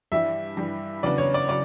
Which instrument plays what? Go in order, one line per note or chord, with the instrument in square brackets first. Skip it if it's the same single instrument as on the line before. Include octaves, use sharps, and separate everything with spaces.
[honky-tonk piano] G2 E3 G3 [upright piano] E5
[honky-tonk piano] G2 E3 G3
[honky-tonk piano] E2 C#3 F#3 B3 D4 [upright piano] D5
[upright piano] C#5
D5
[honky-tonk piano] C#3 F#3 [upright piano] D5